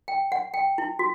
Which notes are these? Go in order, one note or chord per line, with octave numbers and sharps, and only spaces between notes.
G5
F#5
G5
E4
F#4